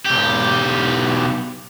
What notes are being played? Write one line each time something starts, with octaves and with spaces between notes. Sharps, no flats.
B1 G4